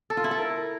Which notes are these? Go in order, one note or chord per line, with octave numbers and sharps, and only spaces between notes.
A4
F4
E4
A4
A#4